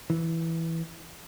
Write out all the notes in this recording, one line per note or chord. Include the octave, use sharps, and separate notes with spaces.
E3